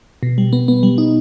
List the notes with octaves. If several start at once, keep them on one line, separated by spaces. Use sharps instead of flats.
B2
G3
B3
B3
G3
D#4